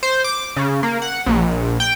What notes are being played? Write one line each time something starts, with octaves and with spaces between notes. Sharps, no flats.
C5
D6
C#3
A#3
F#5
A#1
G5